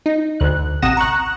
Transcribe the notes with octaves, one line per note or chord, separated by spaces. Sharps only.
D#4
D2 F#6
A1 C3 F#5 D#6 A#6 E7
A#5 C#6 F#6